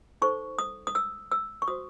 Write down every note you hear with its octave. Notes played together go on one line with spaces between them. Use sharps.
D#4 A4 C5 C#6
D#6
D#6
E6
E6
C#6
F#4 C5 D#6